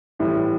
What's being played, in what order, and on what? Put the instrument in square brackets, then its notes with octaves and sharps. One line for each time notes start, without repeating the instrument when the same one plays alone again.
[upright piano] A2 E3 G3